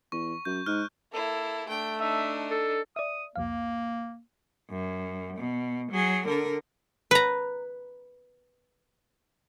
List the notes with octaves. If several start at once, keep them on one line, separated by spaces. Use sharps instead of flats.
E2 C#6
F#2 G6
G#2 F6 F#6
A#3 E4 A4
A3 D4 G5
D4 D#4 E5
A4
D5 E5 D#6
C2 F2 A#3 F5
F#2
B2
F#3 G#4
D3 A#4
B4 A#5